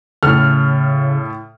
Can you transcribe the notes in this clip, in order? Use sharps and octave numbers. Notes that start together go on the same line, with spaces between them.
A2 C#3 A4 F6